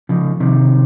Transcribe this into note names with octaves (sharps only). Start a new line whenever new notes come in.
C#3 F3
C3 D#3